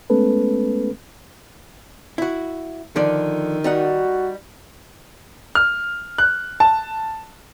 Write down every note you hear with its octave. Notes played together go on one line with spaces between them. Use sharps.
G#3 A3 B3 C#4 A4 B4
E4 F#4
D3 D#3 F3 D5
G3 D#4 F#4 F#5
F6
F#6
A5